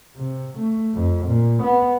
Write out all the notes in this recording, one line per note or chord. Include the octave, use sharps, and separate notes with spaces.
C3
A3
F2
A#2
B3